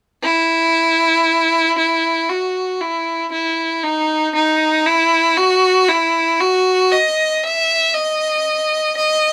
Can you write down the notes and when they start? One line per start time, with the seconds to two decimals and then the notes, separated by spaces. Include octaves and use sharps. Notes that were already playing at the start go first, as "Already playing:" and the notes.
0.23 E4
1.78 E4
2.30 F#4
2.81 E4
3.32 E4
3.83 D#4
4.35 D#4
4.86 E4
5.37 F#4
5.89 E4
6.41 F#4
6.92 D#5
7.44 E5
7.95 D#5
8.97 D#5